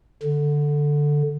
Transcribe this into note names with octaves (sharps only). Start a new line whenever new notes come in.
D3